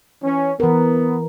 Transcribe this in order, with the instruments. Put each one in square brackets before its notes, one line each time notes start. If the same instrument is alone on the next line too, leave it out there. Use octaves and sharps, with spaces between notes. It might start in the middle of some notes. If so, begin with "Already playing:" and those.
[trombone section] E3 C#4
[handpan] E3 A#4 [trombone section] B3